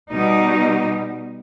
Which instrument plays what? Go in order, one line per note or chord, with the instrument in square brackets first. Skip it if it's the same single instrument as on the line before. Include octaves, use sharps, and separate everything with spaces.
[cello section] B2 G3 D#4